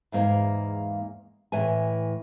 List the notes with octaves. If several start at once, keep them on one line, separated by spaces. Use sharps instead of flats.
E2 G#2 A#3
A2 E3 G#5